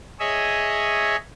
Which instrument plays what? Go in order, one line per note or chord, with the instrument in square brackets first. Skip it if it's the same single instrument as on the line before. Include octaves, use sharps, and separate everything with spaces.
[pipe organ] G#4 C#5 D#5 E5